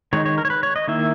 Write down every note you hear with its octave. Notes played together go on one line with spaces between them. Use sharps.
D#3 G#3 D#4 C#5
C#5
A#4
C#5
B4
C#5
D#5
D#3 A#3 E4 E5